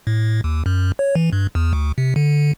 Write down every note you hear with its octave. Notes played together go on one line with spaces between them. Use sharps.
A2
D#2
F#2
C#5
E3
G2
E2
D2
C3
D3